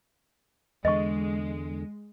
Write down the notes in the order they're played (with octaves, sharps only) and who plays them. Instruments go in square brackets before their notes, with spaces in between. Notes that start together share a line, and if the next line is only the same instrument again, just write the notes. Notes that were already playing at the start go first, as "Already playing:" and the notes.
[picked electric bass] E2 D3 [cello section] G#3 [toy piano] D#5 C#6